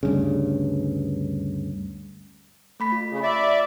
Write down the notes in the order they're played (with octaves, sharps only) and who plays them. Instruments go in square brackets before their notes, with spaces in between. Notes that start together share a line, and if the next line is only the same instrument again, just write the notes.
[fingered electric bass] D2 G2 C#3
[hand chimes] A3 B5 B6
F4
[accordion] C#3
D5 E5